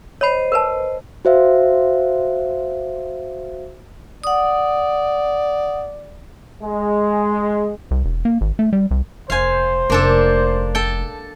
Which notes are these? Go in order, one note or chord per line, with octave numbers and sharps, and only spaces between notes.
C5 C#5 D#5 B5
A#4 B4 A5
F#4 C5 E5 F5
D5 F#5 D#6
G#3
C2
E1
A#3
G#1
A3
G3
C2
F1 C5 F5 G#5
F1 A#3 D4 A4
A4 G5